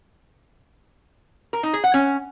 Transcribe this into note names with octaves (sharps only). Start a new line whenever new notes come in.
A#4
D#4
G#4
F#5
C#4